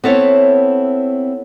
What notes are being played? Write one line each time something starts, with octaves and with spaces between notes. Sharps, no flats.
B3 C4 E4 A4 C#5